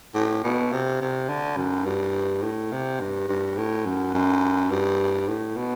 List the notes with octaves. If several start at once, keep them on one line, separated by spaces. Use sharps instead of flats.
A2
B2
C3
C3
D3
F#2
G2
A2
C3
G2
G2
A2
F#2
F#2
G2
A2
B2